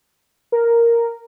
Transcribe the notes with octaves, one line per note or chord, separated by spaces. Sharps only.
A#4